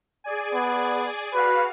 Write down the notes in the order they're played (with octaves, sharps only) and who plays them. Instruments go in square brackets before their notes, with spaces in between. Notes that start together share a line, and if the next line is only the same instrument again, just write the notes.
[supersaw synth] G#4 D5 G#5
[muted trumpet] B3
[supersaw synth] F#4 F5 [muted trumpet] B4